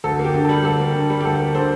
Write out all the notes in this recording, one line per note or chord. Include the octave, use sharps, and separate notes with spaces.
D2 A4
A#3
G4
D3
G3 A4
D2 A4
A#3
D3
G3
G4
D2 A4
A#3
D3 A4 C5